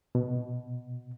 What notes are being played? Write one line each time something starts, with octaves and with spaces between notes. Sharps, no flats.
B2